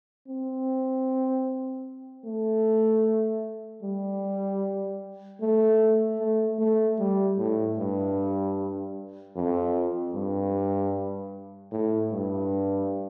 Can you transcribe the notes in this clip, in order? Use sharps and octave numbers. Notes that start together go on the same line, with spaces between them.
C4
A3
G3
A3
A3
A3
G3
A2
G2
F2
G2
A2
G2